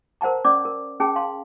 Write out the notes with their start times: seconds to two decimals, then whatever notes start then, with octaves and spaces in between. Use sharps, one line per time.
0.21 A#4 C5 F#5 A5 A#5
0.45 C#4 D5 D6
0.65 A#4
1.00 C#4 G#4 G5 A5
1.16 F5 A5 C6